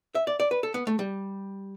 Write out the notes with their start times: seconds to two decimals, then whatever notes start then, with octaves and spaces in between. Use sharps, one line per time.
0.15 E5
0.27 D5
0.40 D5
0.51 B4
0.63 A4
0.74 B3
0.87 A3
0.99 G3